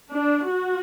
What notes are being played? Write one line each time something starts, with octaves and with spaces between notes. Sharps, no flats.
D4
F#4